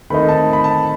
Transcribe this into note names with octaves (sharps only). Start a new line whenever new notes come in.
D#3 A3 C4 D#4 B5
A5
B5
A5